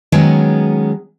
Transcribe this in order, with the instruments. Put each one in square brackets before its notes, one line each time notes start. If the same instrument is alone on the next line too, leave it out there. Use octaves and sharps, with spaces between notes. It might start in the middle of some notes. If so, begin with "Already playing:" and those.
[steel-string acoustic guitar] D#3 F#3 G#3 B3 C#4